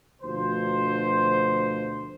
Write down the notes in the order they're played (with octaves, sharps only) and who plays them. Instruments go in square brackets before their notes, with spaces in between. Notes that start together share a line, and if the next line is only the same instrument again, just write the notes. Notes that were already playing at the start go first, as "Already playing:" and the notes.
[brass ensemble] D2 B2 F3 C5